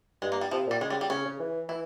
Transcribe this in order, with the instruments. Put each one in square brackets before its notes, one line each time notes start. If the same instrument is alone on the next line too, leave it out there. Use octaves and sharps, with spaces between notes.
[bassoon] G2 [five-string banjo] G#3
[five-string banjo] A#3
G3
[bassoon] C3 [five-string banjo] F3
[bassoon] A#2 [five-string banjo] G3
[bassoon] C#3 [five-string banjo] G#3
[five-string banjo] G3
G3
[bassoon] C#3 [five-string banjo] C#4
[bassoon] C#3
E3
[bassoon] E3 [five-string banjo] E4